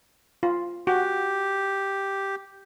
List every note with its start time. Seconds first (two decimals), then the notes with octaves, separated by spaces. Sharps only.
0.43 F4
0.87 F#4 G4